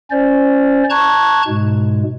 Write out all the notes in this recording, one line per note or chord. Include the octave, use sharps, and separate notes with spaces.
C#4 C5 D5
A5 A#5 C#6 F#6 G#6
G#2 B2 G#3